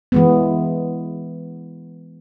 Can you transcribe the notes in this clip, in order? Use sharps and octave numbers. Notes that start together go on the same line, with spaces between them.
E3 G#3 B3